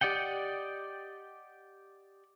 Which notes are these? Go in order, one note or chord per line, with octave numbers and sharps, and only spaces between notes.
G4 D5 D#5 F#5 G5